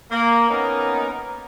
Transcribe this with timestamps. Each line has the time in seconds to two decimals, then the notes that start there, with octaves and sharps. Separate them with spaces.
0.11 A#3
0.49 A#3 B3 C#4 D#4 A#4